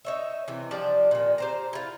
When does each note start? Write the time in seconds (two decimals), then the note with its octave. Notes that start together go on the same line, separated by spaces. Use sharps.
0.05 D#4 C#5 E5
0.48 C3 E3
0.71 F3 G3 D4 D5
1.11 A#2 D#3
1.38 G4 C5 A#5
1.73 E4 F4